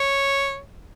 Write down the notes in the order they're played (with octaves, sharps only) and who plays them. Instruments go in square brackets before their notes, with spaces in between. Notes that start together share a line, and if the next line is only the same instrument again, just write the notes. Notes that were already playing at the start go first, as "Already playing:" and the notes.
Already playing: [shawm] C#5